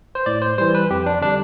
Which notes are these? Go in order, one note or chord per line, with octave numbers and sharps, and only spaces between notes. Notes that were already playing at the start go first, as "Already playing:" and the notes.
C5
A2 D5
C5
E3 G3 C5
B4
F2 G4
D4
D3 G3 D4